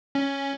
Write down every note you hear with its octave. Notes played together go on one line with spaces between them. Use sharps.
C#4